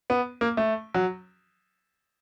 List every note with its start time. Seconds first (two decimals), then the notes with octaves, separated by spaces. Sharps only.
0.10 B3
0.41 A#3
0.57 A3
0.94 F#3